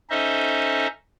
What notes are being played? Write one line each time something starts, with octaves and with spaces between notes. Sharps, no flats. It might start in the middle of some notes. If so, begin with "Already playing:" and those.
C#4 D#4 A4 C5 D#5 E5